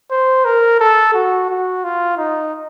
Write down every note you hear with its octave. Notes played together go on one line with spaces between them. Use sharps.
C5
A#4
A4
F#4
F#4
F4
D#4